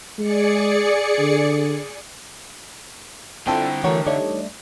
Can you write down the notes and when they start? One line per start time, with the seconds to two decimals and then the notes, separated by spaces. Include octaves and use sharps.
0.19 G#3 G#4 D5 C#7
1.19 D3
3.47 D3 C4 D4 E4 F4 A4 G5
3.84 E3 A3 F#4 A#4 C#5
4.06 G3 A3 D4 D#4 C#5